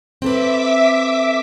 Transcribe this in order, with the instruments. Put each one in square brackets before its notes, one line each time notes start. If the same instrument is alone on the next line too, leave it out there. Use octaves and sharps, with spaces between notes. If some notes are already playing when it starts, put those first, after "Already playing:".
[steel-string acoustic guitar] C4 A4 B4 [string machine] E5 D6 B6